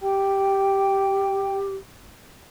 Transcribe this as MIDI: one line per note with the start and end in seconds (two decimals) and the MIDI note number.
0.01 1.75 67
0.01 1.58 79